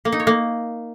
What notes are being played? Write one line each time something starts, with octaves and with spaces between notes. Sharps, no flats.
A#3
D#4
C#5
A#3